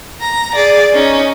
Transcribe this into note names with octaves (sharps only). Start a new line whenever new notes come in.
A#5
G#4 D5
C#4 D#4